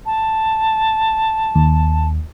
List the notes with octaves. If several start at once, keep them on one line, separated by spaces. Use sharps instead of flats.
A5
D#2